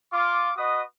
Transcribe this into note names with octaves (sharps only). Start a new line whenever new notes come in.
F4 D6
F#4 B4 D#5 D#6